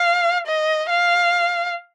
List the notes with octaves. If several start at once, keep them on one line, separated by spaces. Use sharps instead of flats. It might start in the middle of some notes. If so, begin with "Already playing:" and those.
Already playing: F5
D#5
F5